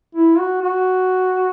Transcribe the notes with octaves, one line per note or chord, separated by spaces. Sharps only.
E4
F#4
F#4